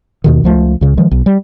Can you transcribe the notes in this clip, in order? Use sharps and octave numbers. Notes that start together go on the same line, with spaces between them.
D#2 B2 D#3
C#2 F3 A3
C#2 C#3
D#3 F3 G#3
B1
G3